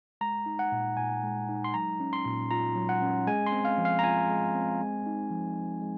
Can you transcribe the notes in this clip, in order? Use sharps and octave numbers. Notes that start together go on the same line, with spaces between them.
G#3 A#5
D#4
F#5
A#2
A#2 G#5
G#3
D#4
C6
F#3 A#5
C#4
C6
A#2
F4 A#5
F#3
F#5
C#4
G#3 G#5
C6
C4
F5
F3
F5
A#5
F4 G#5
G#3
C4
G#3
D#4
F3
F3
G#3